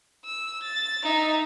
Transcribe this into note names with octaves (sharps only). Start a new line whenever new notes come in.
E6
A6
D#4 E5